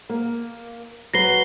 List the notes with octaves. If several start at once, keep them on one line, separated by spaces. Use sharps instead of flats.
A#3
F#3 B4 A#6 C7 G7